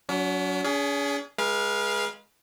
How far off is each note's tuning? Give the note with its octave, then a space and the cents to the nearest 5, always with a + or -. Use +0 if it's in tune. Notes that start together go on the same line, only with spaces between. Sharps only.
F#3 +0 C#4 +45
C#4 +45 G#4 +0
G#3 +0 B4 -35 F5 +0